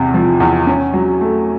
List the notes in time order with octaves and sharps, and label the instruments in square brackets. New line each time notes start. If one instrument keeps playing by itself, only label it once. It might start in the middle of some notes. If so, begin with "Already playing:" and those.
Already playing: [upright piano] E2 C3
F3
E2
C#4
F#3
A3